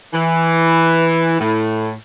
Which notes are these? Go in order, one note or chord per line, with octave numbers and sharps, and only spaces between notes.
E3
A2